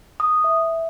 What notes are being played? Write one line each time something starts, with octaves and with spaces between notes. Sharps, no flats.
D#6
E5